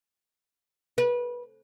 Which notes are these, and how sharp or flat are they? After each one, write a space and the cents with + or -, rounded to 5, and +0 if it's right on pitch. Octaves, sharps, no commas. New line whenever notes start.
B4 -25